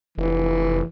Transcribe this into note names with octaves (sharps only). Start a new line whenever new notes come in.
F1 E3